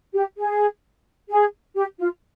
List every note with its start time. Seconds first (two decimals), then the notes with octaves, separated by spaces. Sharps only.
0.14 G4
0.37 G#4
1.30 G#4
1.76 G4
1.99 F4